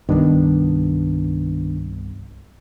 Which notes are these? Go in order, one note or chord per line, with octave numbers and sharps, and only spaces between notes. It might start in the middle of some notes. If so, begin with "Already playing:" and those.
C2 G2 D#3 B3 D4